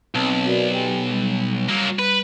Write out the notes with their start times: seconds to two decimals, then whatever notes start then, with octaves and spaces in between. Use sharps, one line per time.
0.15 B1 C4 A5
0.46 F#4 A#4 D5
0.71 G4 G5 G#5
1.10 G3
1.69 F#3 A#3
1.99 B4